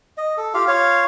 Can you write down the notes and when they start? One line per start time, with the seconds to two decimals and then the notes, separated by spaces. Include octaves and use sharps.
0.17 D#5
0.37 A4
0.54 F4 G4 F5
0.68 F4 C#5 F5